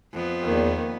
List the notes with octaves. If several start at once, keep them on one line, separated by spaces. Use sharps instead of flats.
F2 B3
E2 D#3 A#3